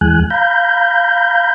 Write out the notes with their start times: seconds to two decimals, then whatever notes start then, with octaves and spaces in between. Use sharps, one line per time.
0.01 E2 E3 G#3 G#5 F#6
0.30 F5 A#5 B5 G6